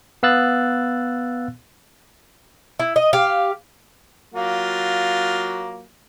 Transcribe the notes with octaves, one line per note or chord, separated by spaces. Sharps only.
B3 F5 E6 F#6 A6
E4
D#5
G4 F5
F#3 A#3 F4